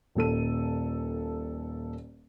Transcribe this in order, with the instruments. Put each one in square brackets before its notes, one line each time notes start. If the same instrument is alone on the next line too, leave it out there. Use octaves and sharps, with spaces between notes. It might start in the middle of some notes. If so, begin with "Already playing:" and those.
[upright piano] D#1 A#2 A4 D#7